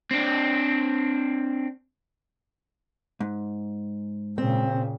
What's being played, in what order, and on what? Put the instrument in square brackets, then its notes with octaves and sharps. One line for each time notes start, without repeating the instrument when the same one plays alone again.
[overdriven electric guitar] C4 D4
[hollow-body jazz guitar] G#2
[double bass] A#2 C#3 [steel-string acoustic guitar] C4